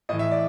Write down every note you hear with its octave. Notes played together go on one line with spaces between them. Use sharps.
A2 E3 D#5
E5
D5